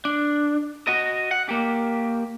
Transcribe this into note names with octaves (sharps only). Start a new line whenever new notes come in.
D4
F#4 D#5
F#5
A#3 G4